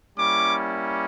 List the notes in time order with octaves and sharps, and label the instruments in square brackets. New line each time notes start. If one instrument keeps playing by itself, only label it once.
[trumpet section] G3 A#3 C#4 E4 D6